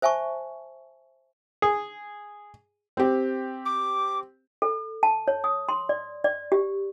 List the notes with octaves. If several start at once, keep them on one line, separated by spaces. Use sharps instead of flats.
C5 E5 G#5 A5 C#6
G#4
C4 G4
D6
A4
A5
C#5
D#6
C6
D5
D5
G4